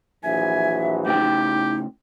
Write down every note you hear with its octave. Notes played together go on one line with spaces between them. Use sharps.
A#1 E3 F#3 E5 G#5
A2 C#3 D#4 G4 G5